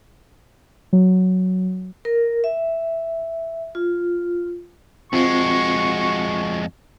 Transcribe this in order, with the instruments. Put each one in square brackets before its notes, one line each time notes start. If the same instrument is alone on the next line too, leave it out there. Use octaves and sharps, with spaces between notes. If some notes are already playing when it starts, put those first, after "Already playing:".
[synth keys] F#3
[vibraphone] A#4
E5
F4
[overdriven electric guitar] F2 G#3 [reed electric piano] C4 F4 [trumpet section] F#4 C#6